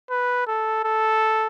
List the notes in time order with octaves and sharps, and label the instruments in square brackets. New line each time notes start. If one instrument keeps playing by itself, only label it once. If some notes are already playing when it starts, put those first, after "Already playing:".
[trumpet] B4
A4
A4